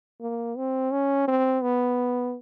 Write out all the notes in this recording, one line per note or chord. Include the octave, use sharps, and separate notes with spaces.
A#3
C4
C#4
C4
B3